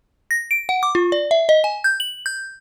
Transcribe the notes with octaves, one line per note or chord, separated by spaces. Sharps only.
A#6
D7
F#5
D6
F4
D5
E5
D#5
G#5
G6
F#7
G6